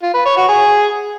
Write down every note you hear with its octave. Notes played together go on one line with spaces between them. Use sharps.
F4
B4
C#5
F#4
G#4